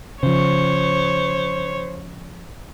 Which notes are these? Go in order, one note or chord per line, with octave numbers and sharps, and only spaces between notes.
C#3 F3 C5 C#5